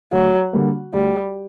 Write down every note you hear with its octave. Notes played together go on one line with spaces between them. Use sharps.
D2 F#3
D3 G3 A#3
D2 G3